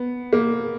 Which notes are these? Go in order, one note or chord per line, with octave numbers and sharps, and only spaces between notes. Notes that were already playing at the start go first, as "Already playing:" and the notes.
Already playing: B3
A#3